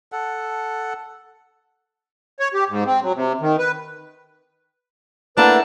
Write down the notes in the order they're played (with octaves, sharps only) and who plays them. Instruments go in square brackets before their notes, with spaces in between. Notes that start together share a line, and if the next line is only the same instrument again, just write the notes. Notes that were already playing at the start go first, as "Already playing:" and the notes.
[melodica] A4 F#5
[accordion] C#5
G4
G#2
C4
F#3
C3
D#3
B4
[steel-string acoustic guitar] A3 A#3 E4 [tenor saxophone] D4 [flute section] B4 F#5 D6